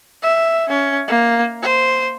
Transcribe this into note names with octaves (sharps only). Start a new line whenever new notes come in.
E5
C#4
A#3
C5